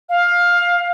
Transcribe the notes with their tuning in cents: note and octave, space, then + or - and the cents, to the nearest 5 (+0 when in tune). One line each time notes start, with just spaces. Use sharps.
F5 +15